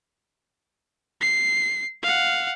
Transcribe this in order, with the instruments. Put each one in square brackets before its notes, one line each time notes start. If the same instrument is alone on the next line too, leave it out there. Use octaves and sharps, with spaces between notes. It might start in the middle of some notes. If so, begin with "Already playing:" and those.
[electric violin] C7
F5 F#5